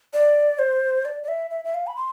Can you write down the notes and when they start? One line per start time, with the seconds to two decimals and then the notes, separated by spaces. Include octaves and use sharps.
0.14 D5
0.59 C5
1.05 D5
1.23 D5
1.28 E5
1.51 E5
1.65 E5
1.74 F5
1.87 B5
1.96 C6